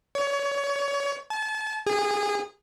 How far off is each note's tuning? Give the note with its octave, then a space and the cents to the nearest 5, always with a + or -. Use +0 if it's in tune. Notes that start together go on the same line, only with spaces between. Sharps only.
C#5 +25
A5 -35
G#4 -25